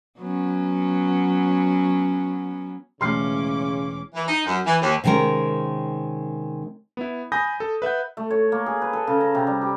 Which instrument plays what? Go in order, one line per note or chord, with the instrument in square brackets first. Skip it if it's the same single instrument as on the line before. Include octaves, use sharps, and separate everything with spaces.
[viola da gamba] F#3 B3 C#4
[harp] E1 A3 [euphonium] C#3 [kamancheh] C#4 D6 [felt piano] C6 F6 C7
[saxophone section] E3
D#4
F#2
E3
D#2
[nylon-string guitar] C3 D#3 G#3 C#4 A#4
[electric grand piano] B3 E4
G#5 B5 D#6 G6 A#6
A4
B4 E5 F#5 G6
[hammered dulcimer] A3
C#5
A#3
G#4
B4
A4
C#3
A#5
C3
G3
G4